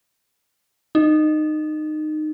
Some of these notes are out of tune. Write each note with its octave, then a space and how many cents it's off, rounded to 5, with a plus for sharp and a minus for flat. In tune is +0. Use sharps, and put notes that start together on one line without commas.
D#4 -20